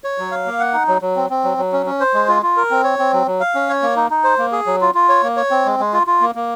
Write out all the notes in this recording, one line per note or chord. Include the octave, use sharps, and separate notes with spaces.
C#5
F#3
F5
A#3
F#5
D#4
F#3
F#3
C4
C4
F#3
F#3
C#4
C#4
C5
G#3
F4
F4
A#4
C4
C#5
C4
F#3
F#3
F5
C#4
C#5
A#3
D#4
D#4
C5
A#3
G#4
F#3
F4
F4
C#5
A#3
C#5
C4
G#3
G#3
F4
F4
A#3
A#3